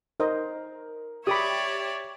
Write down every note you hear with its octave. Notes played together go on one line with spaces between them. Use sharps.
D#4 A#4 C5 D#5
G4 C#5 D5 E5 B5 D6 D#6